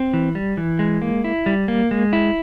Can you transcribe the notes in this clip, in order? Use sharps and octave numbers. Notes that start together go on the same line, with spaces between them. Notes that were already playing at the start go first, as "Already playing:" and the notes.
Already playing: C4
E3
G3
E3
G#3
A#3
E4
G3
A#3
G#3
E4